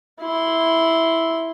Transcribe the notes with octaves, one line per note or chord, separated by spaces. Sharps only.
E4 C6